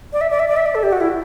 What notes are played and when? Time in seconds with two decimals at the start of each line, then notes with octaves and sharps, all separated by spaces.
0.13 D5
0.21 E5
0.30 D5
0.39 E5
0.48 D5
0.57 E5
0.66 D5
0.75 A4
0.83 G4
0.92 F#4
1.01 E4